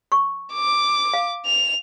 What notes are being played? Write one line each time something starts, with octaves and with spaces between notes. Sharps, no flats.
C#6
D6
F5
F7